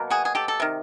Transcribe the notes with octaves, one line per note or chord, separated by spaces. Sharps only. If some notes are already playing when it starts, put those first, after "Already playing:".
Already playing: B2 F#3 A#3
F#4 G#4
G#4
G4 A4
A4
C3 D#3